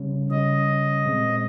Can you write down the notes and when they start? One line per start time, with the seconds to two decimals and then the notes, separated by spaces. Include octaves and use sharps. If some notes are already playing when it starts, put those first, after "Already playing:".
Already playing: C#3 G3 C#4
0.31 C#3 G3 C#4 D#5
1.05 A#2 G#3 C4